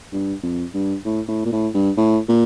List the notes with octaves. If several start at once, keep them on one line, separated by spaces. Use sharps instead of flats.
G2
F2
G2
A2
A2
A#2
A2
G2
A2
A#2